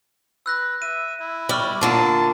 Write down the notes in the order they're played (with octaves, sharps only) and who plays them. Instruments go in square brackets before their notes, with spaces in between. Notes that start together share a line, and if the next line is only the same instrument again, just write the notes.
[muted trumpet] B4 [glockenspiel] E6 F#6 A#6
[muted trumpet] E5 [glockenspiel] D#7
[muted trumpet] E4
[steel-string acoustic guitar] G3 [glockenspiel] C#6 F6 F#7
[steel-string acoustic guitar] A#2 D3 A#3 [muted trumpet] A5